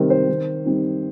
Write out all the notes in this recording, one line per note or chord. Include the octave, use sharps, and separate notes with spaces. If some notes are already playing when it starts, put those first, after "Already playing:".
Already playing: C3 D#3 G3 C4
C5
D#3
G3 C4 D#4